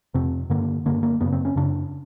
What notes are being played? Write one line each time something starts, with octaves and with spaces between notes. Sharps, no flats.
F2 C3 C4
G2 D3 A#3
G2 D3 A#3
A#3
F#2 C#3 B3
C4
C#4
F#2 C#3 D4